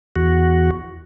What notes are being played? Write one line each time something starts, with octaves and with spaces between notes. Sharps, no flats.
E2 F#4